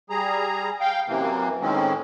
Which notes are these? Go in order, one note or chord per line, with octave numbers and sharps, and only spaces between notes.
G3 G#4 A#5
F5 G5
F#2 C3 E3 A#3
A2 D#3 G#3 C4 C#4